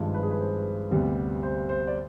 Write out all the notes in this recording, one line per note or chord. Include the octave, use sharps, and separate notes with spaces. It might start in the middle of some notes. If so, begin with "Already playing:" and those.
Already playing: G#1 G2 F3 G#3
B4
G#4
B4
C5
D2 C3 G3 B3
C5
C5
D5